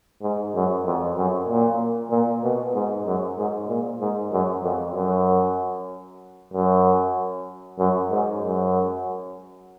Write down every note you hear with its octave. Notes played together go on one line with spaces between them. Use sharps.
G#2
F#2
F2
F#2
A#2
A#2
B2
G#2
F#2
G#2
A#2
G#2
F#2
F2
F#2
F#2
F#2
G#2
F#2